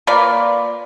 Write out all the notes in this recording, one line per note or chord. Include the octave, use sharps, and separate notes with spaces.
A#3 F4 B4 D5